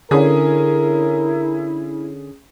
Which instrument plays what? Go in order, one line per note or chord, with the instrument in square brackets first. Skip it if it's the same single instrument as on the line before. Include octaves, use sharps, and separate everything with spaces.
[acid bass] D3 [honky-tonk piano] C#4 G#4 [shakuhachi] E4 [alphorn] A#4